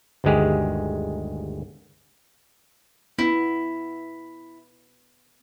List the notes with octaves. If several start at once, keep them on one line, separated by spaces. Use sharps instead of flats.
G1 D2 D#3 G#3 G4 G#4
B3 E4